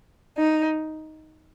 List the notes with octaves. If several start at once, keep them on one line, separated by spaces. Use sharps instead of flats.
D#4